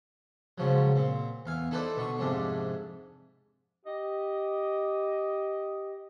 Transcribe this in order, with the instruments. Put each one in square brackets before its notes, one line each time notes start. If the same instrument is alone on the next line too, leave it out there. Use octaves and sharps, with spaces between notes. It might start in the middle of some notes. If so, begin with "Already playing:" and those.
[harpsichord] G#2 C#3 F3 F#3
A#2 C4
E2 F5 G#5
D#4 E4 A4 B4 C5 D5
B2 D3 C#6
F2 G#2 C3 D4
[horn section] G4 D#5